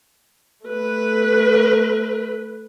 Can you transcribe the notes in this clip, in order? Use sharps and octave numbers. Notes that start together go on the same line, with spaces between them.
A3 B4